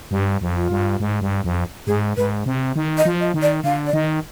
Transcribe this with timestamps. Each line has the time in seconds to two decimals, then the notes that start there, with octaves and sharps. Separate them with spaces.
0.11 G2 G4
0.41 F2
0.56 F4
0.70 G2
1.00 G#2
1.21 G2
1.44 F2
1.87 G#2 G#4
2.17 G#2 B4
2.46 C3
2.76 D#3
2.98 D#5
3.05 F3
3.20 D#5
3.34 D#3
3.42 D5
3.64 D3 F5
3.87 D5
3.93 D#3 D#5